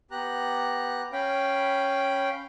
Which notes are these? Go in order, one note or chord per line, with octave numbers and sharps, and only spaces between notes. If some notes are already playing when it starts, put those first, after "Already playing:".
B3 G4 A#5 F#6
C#4 F5 G5 B5